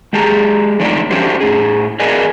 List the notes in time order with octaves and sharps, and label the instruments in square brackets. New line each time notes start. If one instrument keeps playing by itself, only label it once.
[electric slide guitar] G#3 G4 G#4 A5 A#5
D3 F3 A3 D#4 C#5 D5
A3 C#4 D4 F#4 G4 C5
A2 G#4
G#4 A#4 B4 D5 D#5 G#5